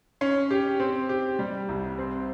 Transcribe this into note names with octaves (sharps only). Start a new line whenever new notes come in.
C#4
G4
C4
G4
G3
C2
C4